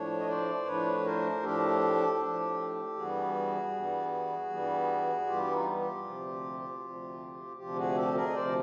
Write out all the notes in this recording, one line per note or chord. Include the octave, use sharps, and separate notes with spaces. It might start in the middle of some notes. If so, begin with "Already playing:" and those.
Already playing: A2 F3 A3 D4 C#5
D#5
C5 D5
A2 F3 A3 D4 B4 C#5
A#4 C5
A2 F3 A3 D4 G4 A4
A2 F3 A3 D4
G2 E3 G3 B3 F#4 G#4
G2 E3 G3 B3
G2 E3 G3 B3
G2 E3 G3 B3 F4 G4
D#4 F4
F4 G4
D2 C3 F3
D2 C3 F3
D2 C3 F3 F4 G4
F#4 G#4
G4 A4
G#4 A#4
D#5
D2 C3 F3 C5 D5